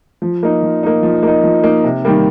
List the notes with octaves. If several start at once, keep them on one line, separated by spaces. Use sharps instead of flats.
F3
A#3 D#4
F3
A#3 D#4
F3
A#3 D#4
F3
A#3 D#4
C3
D#3 G3 A#3